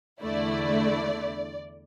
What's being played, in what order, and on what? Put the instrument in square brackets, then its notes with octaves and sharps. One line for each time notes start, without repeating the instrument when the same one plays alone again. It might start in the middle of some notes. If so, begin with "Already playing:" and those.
[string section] E2 D3 A3 E4 D5